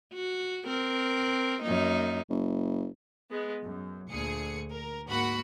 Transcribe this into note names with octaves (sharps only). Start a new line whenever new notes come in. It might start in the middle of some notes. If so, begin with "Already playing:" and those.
F#4
C4 A#4
F#2 A#3 D#4
F#1
G#3 B3
F#2
D2 A#2 G#4 C#7
A#4
G#2 A#3 F#4 F#5 B5